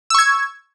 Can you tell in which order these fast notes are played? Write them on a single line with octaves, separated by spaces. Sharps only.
E6 C#6 G#6